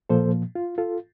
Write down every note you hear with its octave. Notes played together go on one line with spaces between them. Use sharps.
A#2 F3 A#3 A4 C5
F4
F4 A4